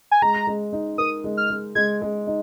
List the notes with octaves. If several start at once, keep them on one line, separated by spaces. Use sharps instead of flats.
G#5
G#3 A#5
G#3
D#4
A#4 D#6
G#3
F6
G#3
G#3 G#6
G#3
D#4